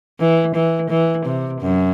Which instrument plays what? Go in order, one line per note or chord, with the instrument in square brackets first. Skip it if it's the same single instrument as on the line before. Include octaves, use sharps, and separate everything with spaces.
[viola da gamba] E3
E3
E3
C3
F#2